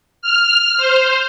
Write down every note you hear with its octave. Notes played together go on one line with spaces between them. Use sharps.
F6
C5